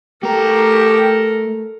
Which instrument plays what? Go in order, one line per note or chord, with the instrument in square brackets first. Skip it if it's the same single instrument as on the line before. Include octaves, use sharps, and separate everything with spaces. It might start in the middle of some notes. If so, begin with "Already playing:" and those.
[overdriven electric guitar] A3 A#5 [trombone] G4 [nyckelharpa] A4 A#4